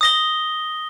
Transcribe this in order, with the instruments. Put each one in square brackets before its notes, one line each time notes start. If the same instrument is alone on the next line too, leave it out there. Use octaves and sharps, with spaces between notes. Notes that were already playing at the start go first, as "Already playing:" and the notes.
[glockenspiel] D#6 A#6 G7